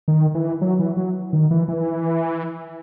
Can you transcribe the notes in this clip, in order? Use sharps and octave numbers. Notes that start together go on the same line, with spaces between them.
D#3
E3
F#3
E3
F#3
D#3
E3
E3